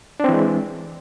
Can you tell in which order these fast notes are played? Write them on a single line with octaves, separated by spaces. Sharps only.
D4 C4 E3 G#3